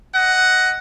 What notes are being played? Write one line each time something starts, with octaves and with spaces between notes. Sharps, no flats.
D#5 F#5